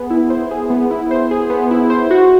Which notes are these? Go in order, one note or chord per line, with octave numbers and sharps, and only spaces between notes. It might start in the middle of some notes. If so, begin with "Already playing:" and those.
Already playing: B3 G#4
E4
C5
G#4
B3
E4
C5
G#4
B3
E4
C5
F#4